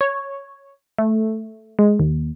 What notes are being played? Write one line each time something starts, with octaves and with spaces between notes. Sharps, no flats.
C#5
A3
G#3
D#2